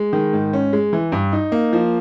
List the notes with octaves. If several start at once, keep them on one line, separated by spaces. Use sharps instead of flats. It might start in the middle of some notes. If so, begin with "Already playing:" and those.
Already playing: G#3
D#3
G#2
C#4
G#3
E3
G2
D#4
A#3
F3